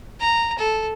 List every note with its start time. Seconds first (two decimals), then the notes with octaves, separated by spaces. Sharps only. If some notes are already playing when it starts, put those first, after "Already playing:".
0.20 A#5
0.59 A4